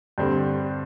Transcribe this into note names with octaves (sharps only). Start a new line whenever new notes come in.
G2 D3 G3 C4